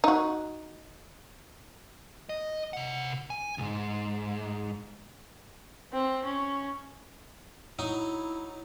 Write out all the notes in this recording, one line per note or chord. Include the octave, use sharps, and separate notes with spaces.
D#4 F#4
D#5
C3 F#5
G#5
C2 G#2
C4
C#4
F#3 D#4 E4